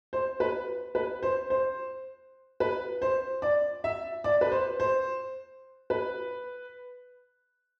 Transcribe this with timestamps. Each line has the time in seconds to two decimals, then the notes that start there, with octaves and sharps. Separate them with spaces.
0.13 C5
0.40 B4
0.95 B4
1.23 C5
1.50 C5
2.60 B4
3.02 C5
3.42 D5
3.84 E5
4.24 D5
4.41 B4
4.52 C5
4.80 C5
5.90 B4